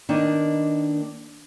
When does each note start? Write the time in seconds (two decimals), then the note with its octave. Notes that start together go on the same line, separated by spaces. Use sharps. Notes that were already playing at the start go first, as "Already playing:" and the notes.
0.09 D#3 A#3 B3 D4 D#4